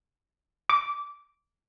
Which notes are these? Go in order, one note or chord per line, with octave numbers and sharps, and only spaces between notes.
D6